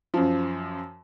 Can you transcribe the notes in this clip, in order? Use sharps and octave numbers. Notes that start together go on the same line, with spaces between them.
F#2 F3